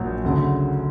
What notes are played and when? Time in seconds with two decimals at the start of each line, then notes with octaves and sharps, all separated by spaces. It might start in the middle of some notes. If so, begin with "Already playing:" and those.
Already playing: A#1 A#2 F#3
0.24 D2 C#3 F#3